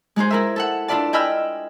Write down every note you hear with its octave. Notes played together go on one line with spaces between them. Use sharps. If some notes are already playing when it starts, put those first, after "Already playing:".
G#3 D#4 G#4 C5
E4 A#4 E5
A4 E5 F#5
D4 E4 F4 B4 D5 A5
D#5 G5 G#5 B5 E6 F6